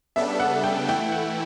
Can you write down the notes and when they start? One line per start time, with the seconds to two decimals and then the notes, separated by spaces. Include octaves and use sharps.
0.16 C#3 G3 B3 D4 A4 E5
0.40 F#5
0.64 G5
0.88 E3 A3 E4 G5
1.12 F#5